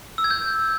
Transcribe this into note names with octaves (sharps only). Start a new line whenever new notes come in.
E6
G#6
G6